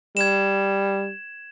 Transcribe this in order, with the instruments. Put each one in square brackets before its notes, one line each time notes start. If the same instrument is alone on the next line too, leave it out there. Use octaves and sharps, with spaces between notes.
[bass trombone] G3 [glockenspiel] G#6 E7